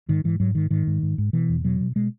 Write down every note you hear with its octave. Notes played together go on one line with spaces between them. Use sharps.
G#2 D#3
G#2 E3
G#2 F#3
G#2 D#3
G#2 D#3
G#2
G#2
G#2
B2 E3
E2
B2 F#3
B2
B2 G#3